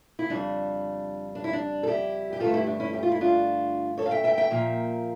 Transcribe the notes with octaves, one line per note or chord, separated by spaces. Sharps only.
E4
F2 C#3 G3 D4
D4
E4
D4
A4
E4 G4
G4
G2 D3 A3 F4 A4
E4 G4
D4
C#4 E4
G4
F4
E4
D4 F4
A4 C#5
F5
E5 G5
E5 G5
E5 G5
A#2 F3 A#3